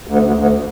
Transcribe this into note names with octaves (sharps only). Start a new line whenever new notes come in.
D2
D2
D2